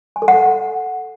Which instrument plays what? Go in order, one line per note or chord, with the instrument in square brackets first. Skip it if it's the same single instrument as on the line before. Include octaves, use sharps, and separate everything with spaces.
[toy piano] G#5
A4
F#5